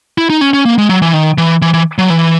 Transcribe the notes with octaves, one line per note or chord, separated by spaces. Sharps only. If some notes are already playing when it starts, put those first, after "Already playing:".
E4
D#4
C#4
C#4
A#3
G#3
F#3
E3
D#3
E3
E3
E3
F#3
E3